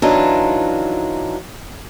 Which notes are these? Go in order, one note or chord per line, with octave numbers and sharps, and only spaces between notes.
E3 F#3 D4 D#4 F4